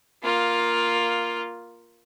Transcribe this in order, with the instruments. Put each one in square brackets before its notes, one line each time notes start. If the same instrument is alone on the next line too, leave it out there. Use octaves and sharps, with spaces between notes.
[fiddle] A#3 F4